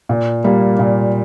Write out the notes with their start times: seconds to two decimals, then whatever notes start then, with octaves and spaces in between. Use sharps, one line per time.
0.09 A#2
0.44 G3 A#3
0.79 A#2